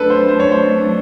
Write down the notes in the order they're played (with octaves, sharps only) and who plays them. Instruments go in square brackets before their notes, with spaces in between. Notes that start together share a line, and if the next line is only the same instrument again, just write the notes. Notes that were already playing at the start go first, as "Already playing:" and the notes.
Already playing: [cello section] F#3 A3 D4 [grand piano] A4 B4
[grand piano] C5
C5
C#5
C5